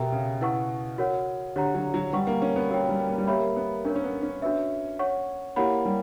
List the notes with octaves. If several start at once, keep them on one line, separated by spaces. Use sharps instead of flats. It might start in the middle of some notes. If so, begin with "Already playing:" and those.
Already playing: B2 G4 A#4 E5 G5 A#5
C#3
E4 B4 F#5 C#6
F#4 A#4 C#5 F#5
D3 G4 C#5 F#5 A#5
F#3
F#3
G3 B4 F#5 C#6
A#3
C#4
B3
A#3 F#4 A#4 C#5 G5
G3
A#3
G3
A#3 G4 A#4 C#5 E5 B5
B3
C#4 D4 A#4 C#5
C#4
B3
C#4
D4 F#4 B4 E5
C#5 F#5 C#6
A#3 E4 G4 C#5 F#5 B5
G3